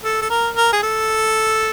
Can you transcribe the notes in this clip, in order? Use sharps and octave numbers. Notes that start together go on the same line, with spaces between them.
A4
A4
A#4
A#4
G#4
A4